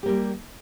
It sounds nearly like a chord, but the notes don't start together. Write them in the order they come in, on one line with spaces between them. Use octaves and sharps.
G4 A#3 G3